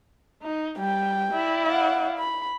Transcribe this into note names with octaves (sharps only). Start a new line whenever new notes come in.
D#4
G3 G5
E4 D5
F5 F#5
B5